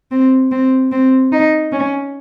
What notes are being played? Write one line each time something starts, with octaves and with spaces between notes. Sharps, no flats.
C4
C4
C4
D#4
C#4